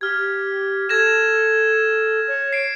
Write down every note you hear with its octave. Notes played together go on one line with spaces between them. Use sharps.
G4 F6 G#6
A4 G#6 A#6 E7
C#5
C7 D7